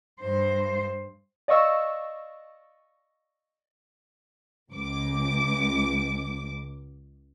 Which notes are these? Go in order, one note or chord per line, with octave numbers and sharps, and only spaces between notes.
G2 C5
D5 D#5 F5 C#6 E6
C#2 D6